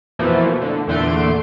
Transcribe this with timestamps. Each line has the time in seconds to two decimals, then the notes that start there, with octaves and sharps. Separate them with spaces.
0.19 F2 B2 E3 F3 A3 A#3
0.62 D3
0.87 E2 A#2 D3 A3 C6 D7